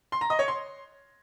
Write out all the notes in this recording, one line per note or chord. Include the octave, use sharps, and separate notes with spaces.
C6
A#5
D#5
C#5
C6